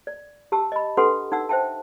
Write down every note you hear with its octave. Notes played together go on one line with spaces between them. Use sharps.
D5
G4 A5 E6
D#5 B5
D4 G4 A4 B4 F#5 C6
D#4 F#5 E6
C5 E5 G5 A5